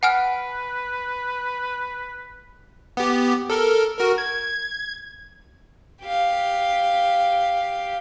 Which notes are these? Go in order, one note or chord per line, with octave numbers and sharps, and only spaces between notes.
B4 F#5 G#5 F6
B3 G4
A4 A#4
F#4 A#4
G#6
G4 F5